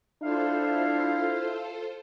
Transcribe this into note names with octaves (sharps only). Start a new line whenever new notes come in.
D4 E4 F4 A4 C5 F5